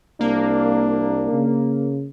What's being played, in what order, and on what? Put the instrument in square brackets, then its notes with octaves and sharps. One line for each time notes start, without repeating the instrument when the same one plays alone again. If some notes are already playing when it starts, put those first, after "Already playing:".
[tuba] C2 [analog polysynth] A#3 [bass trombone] D4
[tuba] C#3